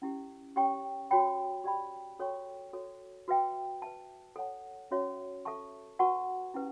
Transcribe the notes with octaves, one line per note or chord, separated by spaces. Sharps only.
C#4 E4 G4
C#4 G4 C#5 G5 C#6
F#4 C#5 G5 B5
G4 D5 G5 B5
F#4 A4 C#5 G5 C#6
F#4 A4 C#5
F#4 B4 E5 G5
B4 E5 A5
A4 C#5 F#5 A5
C#4 F#4 C#5 E5
A4 E5 A5 C#6
F#4 B4 F#5 A5 C#6
C#4 E4 G4 B4